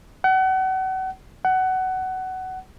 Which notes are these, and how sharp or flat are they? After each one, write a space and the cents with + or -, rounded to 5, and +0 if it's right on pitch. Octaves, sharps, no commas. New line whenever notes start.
F#5 +35
F#5 +20